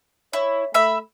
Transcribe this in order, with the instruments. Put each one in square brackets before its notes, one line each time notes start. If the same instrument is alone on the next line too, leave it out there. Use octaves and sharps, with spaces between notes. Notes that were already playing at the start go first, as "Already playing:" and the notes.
[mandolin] E4 [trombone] C#5
[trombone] A3 [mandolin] E5 B5